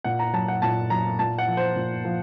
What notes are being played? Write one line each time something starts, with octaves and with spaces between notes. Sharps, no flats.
A#2 F#5
A#5
F#3 A5
F#5
A#2 A5
F#3 A#5
A#2 A5
F#5
F3
C5
A#2
F3